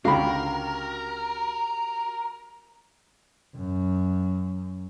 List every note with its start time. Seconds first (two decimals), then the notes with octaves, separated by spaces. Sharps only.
0.05 C#2 D3 F#4 G4 A#4 F5 G5 B5
3.56 F#2